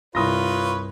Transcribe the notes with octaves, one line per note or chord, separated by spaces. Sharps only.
C2 G2 D3 F4 B4 C#5 D#6 A#6